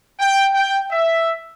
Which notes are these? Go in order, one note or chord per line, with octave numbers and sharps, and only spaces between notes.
G5
G5
E5